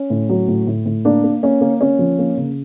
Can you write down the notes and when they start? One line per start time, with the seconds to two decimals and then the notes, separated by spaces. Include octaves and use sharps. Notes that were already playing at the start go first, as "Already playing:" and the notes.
Already playing: C#4
0.10 A2
0.29 F#3
0.48 A2
0.67 A2
0.86 A2
1.05 A#3 D4
1.24 A#3
1.43 A#3 C#4
1.61 A#3
1.81 A#3 C#4
1.99 F3
2.19 A#3
2.37 C#3